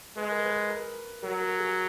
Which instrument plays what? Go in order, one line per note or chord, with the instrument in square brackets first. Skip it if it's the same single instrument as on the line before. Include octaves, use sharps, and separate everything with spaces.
[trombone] G#3 [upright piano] B4
[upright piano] A#4
B4
A#4
[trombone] F#3 [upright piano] A#4
[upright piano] A#4
G#4